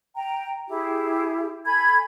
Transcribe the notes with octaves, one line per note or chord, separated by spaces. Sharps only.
G5 A#5
E4 G4 G#4
A4 G#5 B5 G#6